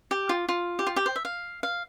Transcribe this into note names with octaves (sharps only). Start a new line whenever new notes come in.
G4
F4
F4
G4
F4
G4
C5
E5
F5
F5